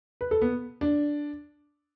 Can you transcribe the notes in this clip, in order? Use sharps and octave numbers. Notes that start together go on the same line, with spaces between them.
B4
A4
B3
D4